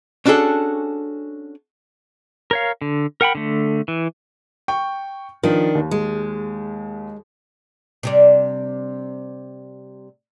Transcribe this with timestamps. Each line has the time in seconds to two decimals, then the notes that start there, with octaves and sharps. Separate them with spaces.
0.26 C#4 D4 F#4 G#4 A4
2.51 A#4 C#5 F5
2.82 D3
3.21 A#4 F#5 G5 B5
3.35 D3 A3
3.88 E3
4.68 G5 C#6
5.43 D#3 F3 D4
5.75 D#2
5.91 G#3
8.03 C3 G3 D4